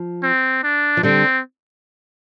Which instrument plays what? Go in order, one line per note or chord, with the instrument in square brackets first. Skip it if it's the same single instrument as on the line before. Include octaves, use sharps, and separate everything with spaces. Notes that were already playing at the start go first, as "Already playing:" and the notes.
Already playing: [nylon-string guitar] F3
[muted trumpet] C4
D4
[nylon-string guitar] F3
[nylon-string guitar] D3 G3 [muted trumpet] C4